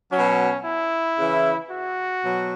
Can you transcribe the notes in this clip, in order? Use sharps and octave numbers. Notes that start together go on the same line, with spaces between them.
F#3 C#4
B2
E4
C#3 E3
F#4
B2 F#3